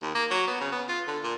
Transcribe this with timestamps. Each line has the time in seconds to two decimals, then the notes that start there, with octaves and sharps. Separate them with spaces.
0.02 D#2
0.15 A#3
0.31 F#3
0.47 B3
0.61 C#3
0.72 B3
0.89 F4
1.07 D3
1.24 A#2